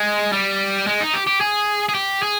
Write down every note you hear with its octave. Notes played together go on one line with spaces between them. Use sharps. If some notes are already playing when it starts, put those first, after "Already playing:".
Already playing: G#3
G3
G#3
D#4
G4
G4
G#4
G#4
G4
G#4